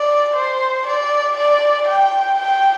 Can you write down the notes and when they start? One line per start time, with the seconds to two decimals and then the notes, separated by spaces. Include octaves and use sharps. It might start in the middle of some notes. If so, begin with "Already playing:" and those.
Already playing: D5
0.36 C5
0.87 D5
1.37 D5
1.88 G5
2.39 G5